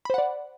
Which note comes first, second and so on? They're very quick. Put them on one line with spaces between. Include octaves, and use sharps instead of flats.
B5 C5 F#5 D5